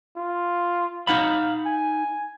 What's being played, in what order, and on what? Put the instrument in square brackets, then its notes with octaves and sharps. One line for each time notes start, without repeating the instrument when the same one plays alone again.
[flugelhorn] F4
[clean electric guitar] D#4 F#5 B5 [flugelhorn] F5
[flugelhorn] G#5